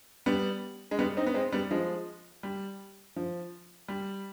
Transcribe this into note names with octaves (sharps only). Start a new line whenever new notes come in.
G3 B3
G#3
G3 B3
C4 D#4
B3
G#3 C4
G3 B3
F3 G#3
G3
F3
G3